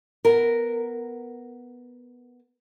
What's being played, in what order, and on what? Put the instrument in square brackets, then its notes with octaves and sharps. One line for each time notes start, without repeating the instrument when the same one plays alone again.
[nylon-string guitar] B3 A#4